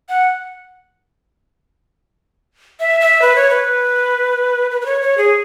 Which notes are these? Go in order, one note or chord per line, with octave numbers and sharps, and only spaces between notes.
F#5
E5
E5
B4
C#5
B4
B4
B4
C#5
C#5
G#4